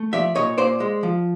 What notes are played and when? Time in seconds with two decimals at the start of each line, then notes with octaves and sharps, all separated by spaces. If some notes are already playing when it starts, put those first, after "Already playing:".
Already playing: A3
0.13 F3 D5 E5
0.35 A#2 C#5 D#5
0.58 A#2 C5 D5
0.80 G#3
1.03 F3